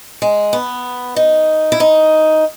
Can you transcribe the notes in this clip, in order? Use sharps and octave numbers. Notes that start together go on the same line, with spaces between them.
G#3
B3
D#4
E4
D#4